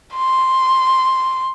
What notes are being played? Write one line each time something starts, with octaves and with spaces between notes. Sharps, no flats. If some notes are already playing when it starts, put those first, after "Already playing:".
C6